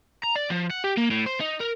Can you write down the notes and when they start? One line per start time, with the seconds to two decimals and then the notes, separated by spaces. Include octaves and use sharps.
0.23 A#5
0.36 D5
0.50 F3
0.70 F#5
0.84 G4
0.98 A#3
1.11 A2
1.26 C5
1.40 D#4
1.60 A#4